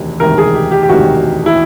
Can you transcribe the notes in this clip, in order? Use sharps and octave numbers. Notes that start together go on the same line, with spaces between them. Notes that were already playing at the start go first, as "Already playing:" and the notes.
Already playing: E1 D2 C3 D#3
E1 D2 C3 D#3 A#4
G#4
G4
G4
G4
E1 D2 C3 D#3 F#4
E4